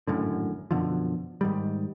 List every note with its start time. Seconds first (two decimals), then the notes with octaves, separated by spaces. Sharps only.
0.07 G#1 F#2 A2 D3
0.71 F#2 B2 D3 F3
1.41 G#2 D#3 G3